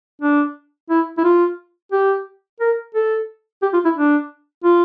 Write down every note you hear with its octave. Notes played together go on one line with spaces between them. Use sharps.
D4
E4
E4
F4
G4
A#4
A4
G4
F4
E4
D4
F4